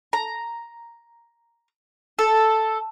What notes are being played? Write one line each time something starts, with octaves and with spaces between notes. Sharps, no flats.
A#5
A4